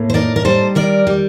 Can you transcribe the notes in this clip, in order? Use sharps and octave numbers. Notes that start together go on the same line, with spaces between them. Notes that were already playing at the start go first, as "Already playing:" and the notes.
Already playing: A2 A#3
C5
D#4 A#4 D5
A#4
G3 A4 C5
D#3 A#4 D5
G3